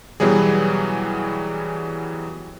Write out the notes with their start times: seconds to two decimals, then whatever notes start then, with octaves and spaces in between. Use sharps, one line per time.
0.20 B2 E3 F#3 G3 G#4